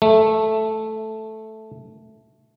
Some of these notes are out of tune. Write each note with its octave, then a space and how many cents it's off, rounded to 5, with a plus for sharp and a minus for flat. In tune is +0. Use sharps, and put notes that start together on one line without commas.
A3 -5